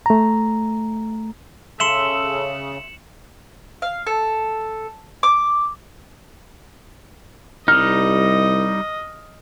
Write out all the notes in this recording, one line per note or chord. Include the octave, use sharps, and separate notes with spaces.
A3 A#5
C#3 A4 E5 C6 C#7 E7 F#7
F5
A4
D6
C2 G3 D#4 D#5 F6